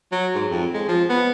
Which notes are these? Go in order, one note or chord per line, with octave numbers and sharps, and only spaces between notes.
F#3
G#2
F2
G#3
F3
B3